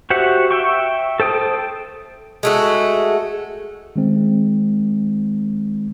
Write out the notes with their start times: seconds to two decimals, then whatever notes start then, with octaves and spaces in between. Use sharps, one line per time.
0.10 F#4 G4 C5 E5 F#5
0.51 E5 G5 C#6
1.20 A4 C5 G5 D#6
2.43 G#3 A3 F#4
3.96 D#3 G#3 C4